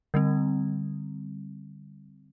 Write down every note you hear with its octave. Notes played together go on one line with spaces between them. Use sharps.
D3 G3 C4